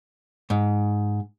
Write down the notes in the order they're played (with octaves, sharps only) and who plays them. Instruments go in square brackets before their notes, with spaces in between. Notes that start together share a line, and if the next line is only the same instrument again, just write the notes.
[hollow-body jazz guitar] G#2